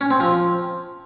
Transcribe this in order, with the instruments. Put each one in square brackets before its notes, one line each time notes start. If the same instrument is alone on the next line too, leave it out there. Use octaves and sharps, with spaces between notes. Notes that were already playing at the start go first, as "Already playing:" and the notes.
[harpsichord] C#4
C4
F3